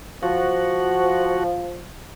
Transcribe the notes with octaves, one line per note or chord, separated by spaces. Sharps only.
F3 F#4